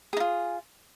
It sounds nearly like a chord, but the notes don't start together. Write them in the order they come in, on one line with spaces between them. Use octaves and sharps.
G#4 D#4 F4